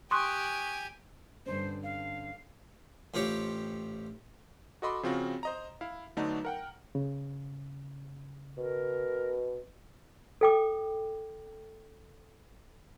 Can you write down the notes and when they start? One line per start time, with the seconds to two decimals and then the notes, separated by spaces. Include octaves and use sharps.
0.11 G4 G#5 C6 C#6 D#6 F#6
1.46 G2 D3 C#4 C5
1.84 F5
3.14 A1 C4 F4 G4 C#5
4.82 F#4 A4 D#5 B5 C6 D6
5.03 C#3 F3 C4 F4 F#4
5.43 C5 D#5 A#5
5.81 E4 F5
6.17 D3 F#3 A3 B3 D4 D#4
6.45 A#4 F#5 G5
6.95 C#3
8.57 B2 A#4
10.41 A4 G5 D6